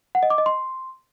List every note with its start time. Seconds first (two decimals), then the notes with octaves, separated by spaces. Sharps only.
0.15 F#5
0.23 D#5
0.30 D6
0.38 D#5
0.46 C6